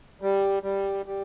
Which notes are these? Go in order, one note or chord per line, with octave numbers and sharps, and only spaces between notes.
G3
G3
G3